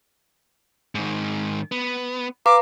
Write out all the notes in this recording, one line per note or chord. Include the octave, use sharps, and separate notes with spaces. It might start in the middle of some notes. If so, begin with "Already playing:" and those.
G#2 D#3
B3
B4 F5 A#5 D6